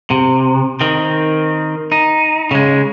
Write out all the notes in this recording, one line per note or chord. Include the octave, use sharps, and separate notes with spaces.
C3
D#3 C4
D#4
C#3 G#3